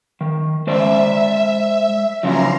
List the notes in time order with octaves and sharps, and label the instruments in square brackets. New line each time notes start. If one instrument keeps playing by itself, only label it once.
[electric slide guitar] D#3
[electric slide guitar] G#3 C5 D5 [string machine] E5
[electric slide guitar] C#3 F3 F#3 [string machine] A#5 C6